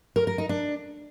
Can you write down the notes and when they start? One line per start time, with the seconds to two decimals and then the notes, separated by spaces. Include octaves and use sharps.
0.16 A#4
0.27 A#4
0.38 D#4
0.49 D4